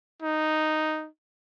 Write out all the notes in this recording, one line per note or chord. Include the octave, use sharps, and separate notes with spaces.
D#4